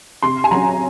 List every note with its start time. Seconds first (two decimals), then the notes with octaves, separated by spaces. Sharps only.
0.23 C3 C6
0.44 G#5
0.51 F#3 C#4 A#5